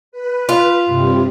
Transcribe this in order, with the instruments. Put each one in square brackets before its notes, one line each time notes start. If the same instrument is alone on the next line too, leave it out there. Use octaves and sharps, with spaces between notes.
[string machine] B4
[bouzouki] F4
[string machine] G2 C3 G3